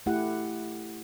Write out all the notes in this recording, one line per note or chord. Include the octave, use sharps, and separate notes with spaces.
A3 E4 G4 F#5